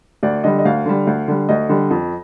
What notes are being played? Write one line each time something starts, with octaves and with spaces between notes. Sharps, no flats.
D2 D5
D3 G3 D#5
D#5
D2 F5
D3 G3
D2
D3 G3
D2 D#5
D3 G3
F2